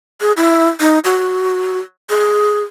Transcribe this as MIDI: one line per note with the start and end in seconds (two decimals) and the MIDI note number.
0.21 0.32 68
0.37 0.69 64
0.80 0.99 63
1.04 1.79 66
2.10 2.63 68